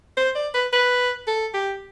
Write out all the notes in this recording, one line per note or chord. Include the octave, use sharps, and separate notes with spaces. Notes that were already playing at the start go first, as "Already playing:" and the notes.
C5
D5
B4
B4
A4
G4